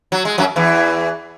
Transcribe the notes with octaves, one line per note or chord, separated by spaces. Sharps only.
F#3
G#3
F#2 F#3
E2 E3